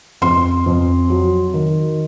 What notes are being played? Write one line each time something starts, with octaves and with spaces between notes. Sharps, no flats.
F2 C6
F2
F#3
D#3